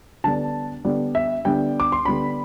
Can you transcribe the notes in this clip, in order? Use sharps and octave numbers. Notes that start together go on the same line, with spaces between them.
D3 G3 B3 D4 A5
D3 G3 B3 D4
E5
D3 G3 B3 D4 G5
D6
C6
D3 G3 B3 D4 B5